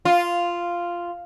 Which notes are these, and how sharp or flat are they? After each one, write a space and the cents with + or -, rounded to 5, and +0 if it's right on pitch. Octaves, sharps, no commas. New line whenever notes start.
F4 -5